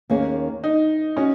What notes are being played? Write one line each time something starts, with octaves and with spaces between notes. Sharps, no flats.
D#2 D#3 A#3 C#4 G#4
D#4
C#4 F#4 D#5